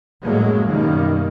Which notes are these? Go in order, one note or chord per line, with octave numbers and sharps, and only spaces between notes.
F#2 A2 F#3 G#3 A#3
F#2 B2 D#3 G3 A#3